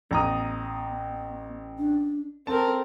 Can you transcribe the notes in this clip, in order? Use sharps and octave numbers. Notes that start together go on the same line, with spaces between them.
A1 B3 A#5 D#6
D4
C4 A4 A#4 A5